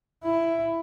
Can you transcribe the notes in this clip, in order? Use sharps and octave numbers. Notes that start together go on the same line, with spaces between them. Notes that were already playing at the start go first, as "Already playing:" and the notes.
E4